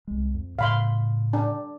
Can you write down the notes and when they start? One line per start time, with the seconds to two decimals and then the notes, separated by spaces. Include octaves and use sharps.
0.07 C2 G#3
0.34 F2
0.59 A2 C#3 F5 B5 C6
1.33 D4